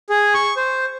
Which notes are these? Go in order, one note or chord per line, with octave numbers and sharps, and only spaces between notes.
G#4
C#6
C5